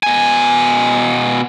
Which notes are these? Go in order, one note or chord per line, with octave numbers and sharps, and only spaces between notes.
B2 G#5